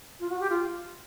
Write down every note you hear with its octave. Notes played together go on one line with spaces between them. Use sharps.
F4
F#4
G4
F4